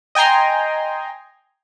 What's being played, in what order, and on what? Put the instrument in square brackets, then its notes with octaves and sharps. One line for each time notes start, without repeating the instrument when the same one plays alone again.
[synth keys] D#5 G5 G#5 A#5 C6